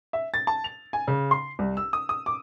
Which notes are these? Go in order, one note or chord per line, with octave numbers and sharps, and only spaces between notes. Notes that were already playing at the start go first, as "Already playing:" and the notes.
E5
A6
A5
F7
G#5
C#3
C6
C2
E6
D#6
D#6
D6